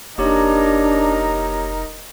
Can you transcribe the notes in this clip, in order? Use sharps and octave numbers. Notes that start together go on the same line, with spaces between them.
F1 A#3 D4 D#4 G4 A#4 C#5